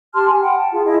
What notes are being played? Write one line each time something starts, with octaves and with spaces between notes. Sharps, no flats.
G4 A5 C6 F6
G#5
F#5 G5 B5
A5
F4 G#4 F5
E4 G#4 D#5